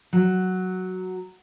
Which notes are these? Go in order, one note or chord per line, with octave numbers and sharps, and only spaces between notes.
F#3